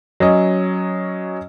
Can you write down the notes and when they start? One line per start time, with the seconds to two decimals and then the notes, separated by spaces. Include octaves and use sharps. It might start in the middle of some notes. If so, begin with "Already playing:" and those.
0.20 F#3 C#4 D#5